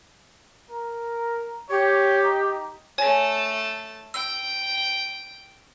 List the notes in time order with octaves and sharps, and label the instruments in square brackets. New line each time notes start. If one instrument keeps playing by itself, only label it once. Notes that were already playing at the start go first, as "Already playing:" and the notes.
[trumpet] A#4
[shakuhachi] G4 [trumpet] C#5
[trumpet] D#4
[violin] A3 A5 [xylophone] C#5 G#5
[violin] G5 [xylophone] E6